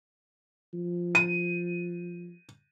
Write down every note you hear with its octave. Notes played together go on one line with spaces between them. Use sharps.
F3
D#7